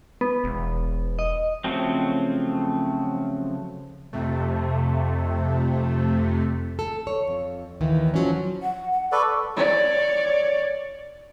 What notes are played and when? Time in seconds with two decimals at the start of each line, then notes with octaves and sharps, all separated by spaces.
0.21 B3
0.44 E1
1.19 D#5
1.64 C#3 F3 F#3 A3 C4
4.13 F2 C3 A3
6.79 A4
7.07 C#5
7.27 F2
7.81 D#2 D#3 E3
8.14 F3 F#3 C#4
8.63 F#5
8.92 F#5
9.12 A4 B4 D5 C#6
9.57 C#5 D5